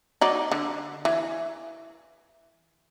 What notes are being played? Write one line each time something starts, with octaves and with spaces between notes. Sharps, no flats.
F#3 D#4 D5
D3
E3